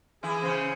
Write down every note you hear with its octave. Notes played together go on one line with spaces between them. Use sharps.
E3 E4 G#4
C#3 C#4 C5